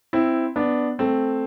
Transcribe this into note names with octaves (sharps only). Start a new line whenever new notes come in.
C4 E4
B3 D4
A3 C4